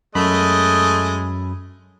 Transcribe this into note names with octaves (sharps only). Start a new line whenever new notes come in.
F#2 G#3 A3 D#5 B5